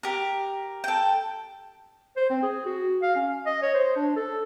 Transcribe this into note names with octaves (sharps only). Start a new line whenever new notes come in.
G4 A#4
A4 G5
C5
C4
G#4
F#4
F5
C#4
D#5
C#5
C5
D4
A4